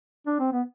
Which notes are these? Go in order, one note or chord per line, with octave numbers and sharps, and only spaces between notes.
D4
C4
B3